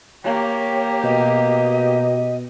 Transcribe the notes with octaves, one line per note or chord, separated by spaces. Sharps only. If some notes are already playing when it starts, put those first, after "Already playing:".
A#3 G4 C#5
B2 D#5